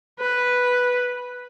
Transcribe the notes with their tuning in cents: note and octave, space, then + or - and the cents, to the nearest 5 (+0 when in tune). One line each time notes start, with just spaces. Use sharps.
B4 +0